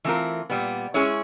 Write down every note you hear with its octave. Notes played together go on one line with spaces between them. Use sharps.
E3 A3 C4 F4 A#4
A#2 G3 B3
G#3 C#4 E4 G#4 C#5